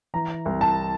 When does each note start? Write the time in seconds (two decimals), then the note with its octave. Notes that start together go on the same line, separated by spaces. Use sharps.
0.14 E3 A#5
0.45 C2
0.61 A5